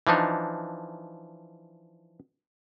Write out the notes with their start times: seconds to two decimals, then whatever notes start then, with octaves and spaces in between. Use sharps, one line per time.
0.07 E3 F3 D4 D#4